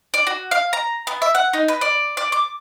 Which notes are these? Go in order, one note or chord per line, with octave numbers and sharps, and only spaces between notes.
D5
F#4
F5
A#5
B3
E5
F#5
D#4
B4
D5
D5
D6